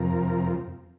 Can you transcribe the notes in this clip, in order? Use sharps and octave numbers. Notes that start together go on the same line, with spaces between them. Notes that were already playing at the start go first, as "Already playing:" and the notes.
Already playing: F2 C3 F3 A#4